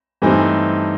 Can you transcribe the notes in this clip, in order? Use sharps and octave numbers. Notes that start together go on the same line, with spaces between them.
G2 E3 A3 C4 D#4